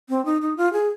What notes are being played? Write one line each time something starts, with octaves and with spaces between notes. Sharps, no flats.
C4
D#4
D#4
F4
G#4